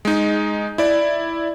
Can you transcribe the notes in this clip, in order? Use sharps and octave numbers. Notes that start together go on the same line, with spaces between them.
G#3 D#4
E4 D5